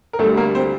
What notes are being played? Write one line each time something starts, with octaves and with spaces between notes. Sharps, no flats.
A#4
D2 D3 G3 A3 A4
A#3 A#4
C4 C5